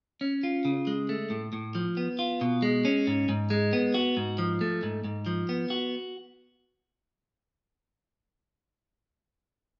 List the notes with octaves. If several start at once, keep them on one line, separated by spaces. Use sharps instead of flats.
C#4
F4
C#3
G#3
A3
A2
A2
F3
B3
F4
B2
G#3
C#4
G#2
G#2
G#3
B3
F#4
G#2
F3
A3
G#2
G#2
F3
B3
F#4